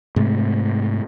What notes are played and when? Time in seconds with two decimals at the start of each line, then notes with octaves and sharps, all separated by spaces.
0.16 G#2 C3 A3